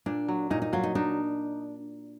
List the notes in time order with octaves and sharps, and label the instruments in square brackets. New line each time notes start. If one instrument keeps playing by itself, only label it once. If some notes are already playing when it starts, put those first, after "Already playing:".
[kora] A#2 [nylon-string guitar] D4
[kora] F#3
[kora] A#2 [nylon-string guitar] D#4
[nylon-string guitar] D#4
[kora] F#3 [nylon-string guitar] F4
[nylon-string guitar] D#4
[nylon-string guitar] D4 [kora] D#4